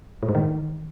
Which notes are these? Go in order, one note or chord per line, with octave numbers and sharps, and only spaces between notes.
A2
G#2
D#3